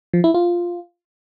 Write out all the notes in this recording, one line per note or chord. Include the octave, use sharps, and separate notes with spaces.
F3
E4
F4